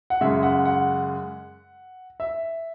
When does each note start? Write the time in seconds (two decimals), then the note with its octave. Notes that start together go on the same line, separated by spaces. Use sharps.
0.10 F#5
0.21 F#2 C#3 G#3 E5
0.43 F#5
0.65 F#5
2.20 E5